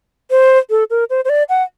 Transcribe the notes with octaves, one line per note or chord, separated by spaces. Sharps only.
C5
A4
A#4
C5
C5
D5
F#5